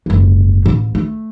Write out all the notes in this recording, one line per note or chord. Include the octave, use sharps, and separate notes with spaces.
F#1 G#2
A1
A3